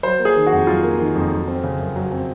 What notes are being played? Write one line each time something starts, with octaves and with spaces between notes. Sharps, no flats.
F#3 C5
A#3
G#4
D#3
F#4
F2
F#3 F4
A#3
D#3
F2
F#3
C4
C#3
F#2
F#3
C4